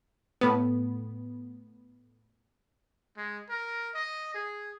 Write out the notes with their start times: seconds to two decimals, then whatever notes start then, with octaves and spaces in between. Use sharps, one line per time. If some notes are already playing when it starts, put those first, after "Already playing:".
0.41 A2 B3
3.17 G#3
3.49 A#4
3.94 D#5
4.34 G#4